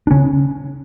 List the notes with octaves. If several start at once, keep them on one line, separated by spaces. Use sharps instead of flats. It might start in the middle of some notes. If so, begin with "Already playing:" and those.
D4
C#3 C#4